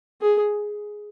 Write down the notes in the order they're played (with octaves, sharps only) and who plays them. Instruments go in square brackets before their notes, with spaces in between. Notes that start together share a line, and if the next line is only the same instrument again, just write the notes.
[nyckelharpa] G#4